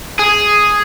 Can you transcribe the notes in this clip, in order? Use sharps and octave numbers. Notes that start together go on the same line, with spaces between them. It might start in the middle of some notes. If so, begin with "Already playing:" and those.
G#4